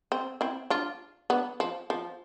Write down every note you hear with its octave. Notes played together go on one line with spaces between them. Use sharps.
C4
C4 E4
D4 F4
B3 D4
F3
F3